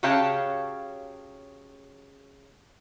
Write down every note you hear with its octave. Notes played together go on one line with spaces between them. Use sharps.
C#3 F#4 G4 C#5 F5 A5